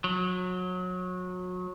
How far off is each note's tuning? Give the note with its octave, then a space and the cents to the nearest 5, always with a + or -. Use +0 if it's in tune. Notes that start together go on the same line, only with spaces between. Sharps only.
F#3 -25